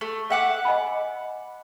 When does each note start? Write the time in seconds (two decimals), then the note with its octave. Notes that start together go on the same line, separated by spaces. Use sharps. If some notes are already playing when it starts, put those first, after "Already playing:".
0.01 A3
0.30 E5 F#5 D6
0.65 D#5 G#5 B5